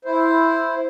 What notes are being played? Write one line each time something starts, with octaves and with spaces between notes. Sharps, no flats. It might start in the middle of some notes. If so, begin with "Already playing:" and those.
E4 C5